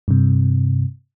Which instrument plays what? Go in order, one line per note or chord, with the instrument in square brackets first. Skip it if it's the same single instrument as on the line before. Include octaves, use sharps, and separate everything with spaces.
[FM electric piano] G2 C3